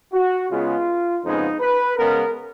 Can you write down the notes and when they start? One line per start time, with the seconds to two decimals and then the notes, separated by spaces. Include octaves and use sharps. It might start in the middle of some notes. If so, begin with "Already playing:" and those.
0.13 F#4
0.49 C#3 G#3 B3 F4
1.23 F2 C#3 G#3 B3 D#4
1.60 B4
1.97 C#3 G#3 B3 A#4